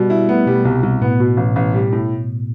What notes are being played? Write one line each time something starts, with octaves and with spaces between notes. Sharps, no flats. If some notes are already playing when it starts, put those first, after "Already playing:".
Already playing: B2 G3
E4
A3 B3
B2 G3
C2 B2
C2
A2 B3
B2
A1
A1
G3
A2